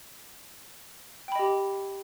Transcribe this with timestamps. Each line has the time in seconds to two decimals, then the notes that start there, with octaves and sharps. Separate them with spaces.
1.28 G5
1.32 B5
1.36 D#5
1.39 G4